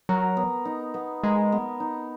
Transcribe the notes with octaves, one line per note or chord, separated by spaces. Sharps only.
F#3 A#4
B3
D#4
B3
G#3 A#4
B3
D#4